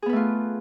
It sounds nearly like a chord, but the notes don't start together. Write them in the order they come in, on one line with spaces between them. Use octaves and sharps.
G#4 B3 B4 A3 F4